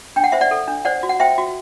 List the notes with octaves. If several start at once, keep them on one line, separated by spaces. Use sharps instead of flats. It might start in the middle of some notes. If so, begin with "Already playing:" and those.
D4 G5
F#5
C5 E5
D5 F#5
A4
D4
C5 D5 F#5
F#4
F#5
C5 E5 G5
F#4